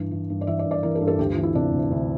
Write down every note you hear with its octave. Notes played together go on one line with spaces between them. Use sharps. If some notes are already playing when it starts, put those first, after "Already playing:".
Already playing: G2 E3
E3
G2
D5
E3 E5
D5
G2
D5
E3 A#4
A4
G2
A4
D2 G4
F4
E3
E4
C3 D4
D2
D2